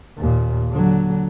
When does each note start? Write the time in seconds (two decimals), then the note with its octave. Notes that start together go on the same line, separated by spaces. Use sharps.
0.18 D#2 A#2
0.70 D3 F#3